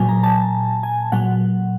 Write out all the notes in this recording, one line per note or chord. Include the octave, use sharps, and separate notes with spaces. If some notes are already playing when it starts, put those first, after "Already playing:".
Already playing: A#2 F#3 G#5
A#5
A5
G#5
A#2 F#3 F#5